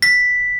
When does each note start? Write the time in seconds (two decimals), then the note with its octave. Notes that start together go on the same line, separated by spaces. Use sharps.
0.02 B6